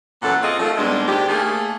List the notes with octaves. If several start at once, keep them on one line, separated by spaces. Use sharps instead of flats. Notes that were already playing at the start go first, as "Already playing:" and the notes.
F#2 A#2 E3 F#3 A4 F#5
F3 C4 F4 G#4 A4 D#5
D#3 F3 F#3 A3
A#2 D#3 G3 G#3 B3 D4
G#2 D#3 D4 G4
A3 A#3 G#4